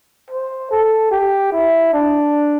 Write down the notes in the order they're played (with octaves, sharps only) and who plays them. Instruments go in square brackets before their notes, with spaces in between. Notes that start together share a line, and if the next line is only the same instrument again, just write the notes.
[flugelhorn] C5
A4
G4
E4
D4